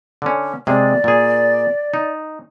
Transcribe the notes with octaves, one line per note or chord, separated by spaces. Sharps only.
D3 C#4
C3 G#3 G#4 D5
A#2 G#4
D#4